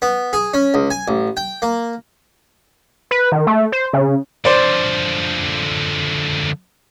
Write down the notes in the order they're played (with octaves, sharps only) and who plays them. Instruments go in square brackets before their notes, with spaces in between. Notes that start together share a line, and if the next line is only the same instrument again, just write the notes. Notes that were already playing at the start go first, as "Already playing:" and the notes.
[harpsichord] B3
G#4
C#4
C#2
G#5
A1
G5
A#3
[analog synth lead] B4
D#3
A3
C5
C#3
[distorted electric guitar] D3 F3 [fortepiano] C5 D5